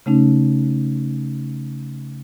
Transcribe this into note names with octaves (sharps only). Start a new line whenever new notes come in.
C#3 A3 C#4 D#4